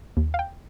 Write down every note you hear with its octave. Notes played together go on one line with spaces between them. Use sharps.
D#2
F5
G5